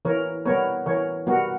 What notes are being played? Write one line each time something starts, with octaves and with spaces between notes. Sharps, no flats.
E3 A#4 C#5
G3 B3 A#4 C#5
E3 A#4 C#5
G3 B3 F#4 A#4